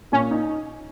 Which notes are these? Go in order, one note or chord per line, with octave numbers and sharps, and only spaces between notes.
A#2 C#4
D#4